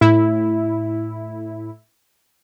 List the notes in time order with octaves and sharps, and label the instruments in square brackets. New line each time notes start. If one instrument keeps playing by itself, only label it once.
[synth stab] A2 E4